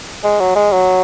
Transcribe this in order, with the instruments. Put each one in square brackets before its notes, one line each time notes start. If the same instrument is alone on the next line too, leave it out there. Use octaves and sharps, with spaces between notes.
[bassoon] G#3
F#3
G#3
F#3